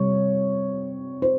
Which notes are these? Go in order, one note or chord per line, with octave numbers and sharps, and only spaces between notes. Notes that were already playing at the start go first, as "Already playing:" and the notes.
Already playing: C3 G3 C#5
C5